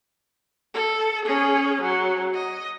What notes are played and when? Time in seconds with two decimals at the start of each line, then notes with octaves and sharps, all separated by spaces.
0.74 A4
1.25 C#4 G#4
1.82 F#3
2.34 D#5